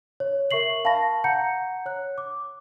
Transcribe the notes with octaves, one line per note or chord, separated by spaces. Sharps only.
C#5
A#4 E5 C#6 C7 F#7
F5 A5 B5 C#6 A#6
F#5 A#5 G6 C#7
C#5 F#6
D6